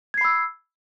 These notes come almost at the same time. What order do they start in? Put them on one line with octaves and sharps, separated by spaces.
G#6 C7 B5 E6